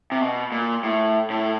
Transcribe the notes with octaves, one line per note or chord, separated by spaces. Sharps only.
C3
B2
A#2
A2
A2